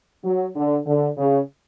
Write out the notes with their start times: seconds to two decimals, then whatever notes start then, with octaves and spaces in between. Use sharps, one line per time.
0.24 F#3
0.56 D3
0.87 D3
1.18 C#3